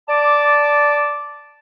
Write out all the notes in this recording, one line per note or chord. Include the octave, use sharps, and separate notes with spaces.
D5 A5 D6